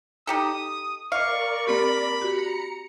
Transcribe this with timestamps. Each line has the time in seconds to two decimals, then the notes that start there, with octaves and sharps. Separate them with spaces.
0.27 D#4 G4 A4 D#6
1.12 A#4 D5 D#5 F5 C#6 D6
1.67 A#3 C4 G4 B5
2.21 F#4 G4 A#5 C#7